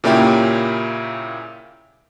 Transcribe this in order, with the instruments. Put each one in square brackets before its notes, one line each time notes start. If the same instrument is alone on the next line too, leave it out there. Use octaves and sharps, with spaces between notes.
[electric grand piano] A#2 C#3 A#3 C#4 E4 G4